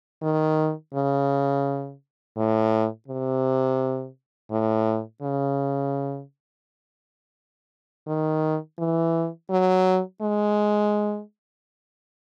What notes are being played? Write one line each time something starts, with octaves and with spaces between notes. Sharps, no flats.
D#3
C#3
A2
C3
A2
C#3
D#3
E3
F#3
G#3